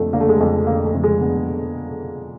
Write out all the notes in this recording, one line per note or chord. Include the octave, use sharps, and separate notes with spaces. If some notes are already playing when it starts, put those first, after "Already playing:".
Already playing: F2 D3 A3 A#3
D3 A#3
A3
G#3
F2 A3
D3 A#3
A3
F2
G#3
D3 B3